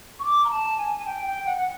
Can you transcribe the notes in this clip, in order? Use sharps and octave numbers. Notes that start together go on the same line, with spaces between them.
C#6
D6
A#5
A5
G#5
G#5
G5
G5
F#5
F#5